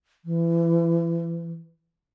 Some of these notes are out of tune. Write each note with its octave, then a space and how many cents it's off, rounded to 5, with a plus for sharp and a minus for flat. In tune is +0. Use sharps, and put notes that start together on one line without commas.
E3 +30